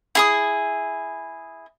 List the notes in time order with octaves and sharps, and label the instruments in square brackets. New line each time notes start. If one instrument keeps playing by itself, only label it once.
[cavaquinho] E4 G#4 D#6